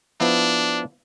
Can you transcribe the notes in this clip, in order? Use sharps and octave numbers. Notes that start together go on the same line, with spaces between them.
F3 B3 D4 E4